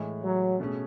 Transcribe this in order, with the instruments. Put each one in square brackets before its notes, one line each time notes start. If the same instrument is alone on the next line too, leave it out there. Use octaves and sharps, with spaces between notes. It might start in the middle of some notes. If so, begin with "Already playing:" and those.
Already playing: [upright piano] A2 E3 G#3
[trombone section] F#3
[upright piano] B2 A3 C#4 G#4